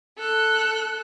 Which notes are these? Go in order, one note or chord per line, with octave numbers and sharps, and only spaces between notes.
A4 F#6